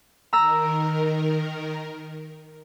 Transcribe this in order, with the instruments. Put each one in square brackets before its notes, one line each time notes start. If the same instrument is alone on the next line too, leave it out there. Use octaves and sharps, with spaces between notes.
[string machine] D#3 A#4 [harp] A#5 E6 A#6